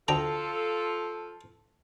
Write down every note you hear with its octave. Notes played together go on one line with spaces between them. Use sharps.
D2 F3 F4 A4 G5 A5 A#5